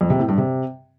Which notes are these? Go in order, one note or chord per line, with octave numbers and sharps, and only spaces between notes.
F2
C3
A2
G2
C3